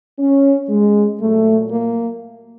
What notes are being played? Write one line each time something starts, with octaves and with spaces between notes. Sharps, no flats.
C#4
G#3
A#2 F#3 A3
A#3